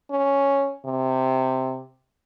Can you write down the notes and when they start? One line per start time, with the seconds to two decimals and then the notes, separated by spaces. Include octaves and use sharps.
0.11 C#4
0.86 C3